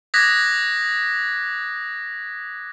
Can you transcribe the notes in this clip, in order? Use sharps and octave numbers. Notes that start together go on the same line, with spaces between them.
D6 D#6 F#6 G#6 A#6 B6